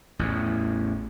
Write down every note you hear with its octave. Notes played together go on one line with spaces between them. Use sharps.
A1 E2